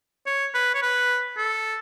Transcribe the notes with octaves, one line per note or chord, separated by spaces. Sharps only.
C#5
B4
C#5
B4
A4